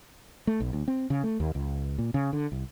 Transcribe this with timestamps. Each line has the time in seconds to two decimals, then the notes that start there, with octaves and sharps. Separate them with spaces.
0.47 A3
0.60 B1
0.73 D2
0.88 C4
1.10 C#3
1.24 A3
1.40 D#2
1.55 C#2
1.98 A#2
2.14 C#3
2.33 D3
2.52 C2